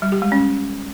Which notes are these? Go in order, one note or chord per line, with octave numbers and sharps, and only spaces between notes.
G3
G4
G#3
C#4